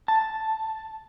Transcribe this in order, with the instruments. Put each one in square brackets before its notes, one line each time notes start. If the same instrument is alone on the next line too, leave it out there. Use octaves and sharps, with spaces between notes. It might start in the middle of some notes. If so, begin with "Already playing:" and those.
[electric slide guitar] A5